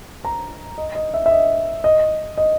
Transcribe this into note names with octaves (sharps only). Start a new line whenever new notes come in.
A#5
D#5
D#5
E5
E5
D#5
D#5
D#5